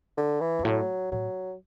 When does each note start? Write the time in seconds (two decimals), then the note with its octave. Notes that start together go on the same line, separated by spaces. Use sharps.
0.17 D3
0.40 E3
0.59 F#2
0.64 A2 F#3
1.12 A2 F#3